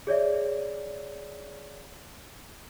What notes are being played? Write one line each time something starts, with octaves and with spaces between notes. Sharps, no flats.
G#4 C#5 D5 E5